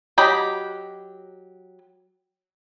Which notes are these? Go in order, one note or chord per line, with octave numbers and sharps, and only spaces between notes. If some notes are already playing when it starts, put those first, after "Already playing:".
F#3 G4 D#5 B5